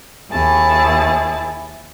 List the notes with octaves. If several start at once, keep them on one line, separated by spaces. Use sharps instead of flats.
D#2 E4 G#4 A5